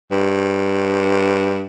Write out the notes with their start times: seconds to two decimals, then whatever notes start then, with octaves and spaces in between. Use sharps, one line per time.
0.11 G2